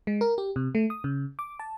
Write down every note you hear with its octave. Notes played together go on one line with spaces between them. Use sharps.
G#3
A#4
G4
C3
A3
D#6
C#3
D6
A5